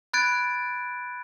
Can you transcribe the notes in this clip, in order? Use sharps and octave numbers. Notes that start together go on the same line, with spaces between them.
B5 F#6 G#6 A6 D7